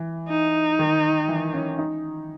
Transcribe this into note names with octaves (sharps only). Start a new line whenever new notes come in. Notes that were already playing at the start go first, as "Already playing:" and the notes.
Already playing: E3
D#4
D#3
E3
C#4
D#4